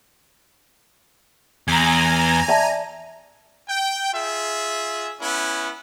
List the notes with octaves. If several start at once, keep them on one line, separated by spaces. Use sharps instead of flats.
E2 G#5 A#5
D5 E5 A5
G5
F4 G#4 E5
B3 C#4 E4